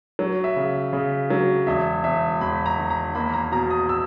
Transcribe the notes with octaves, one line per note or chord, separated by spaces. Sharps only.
F#3
E5
C#3
C#3
F#3
E1 E5
E1 E5
E1 B5
A#5
D#3
A#5
A#3 B5
A#5
B2 A#5
D#6
E6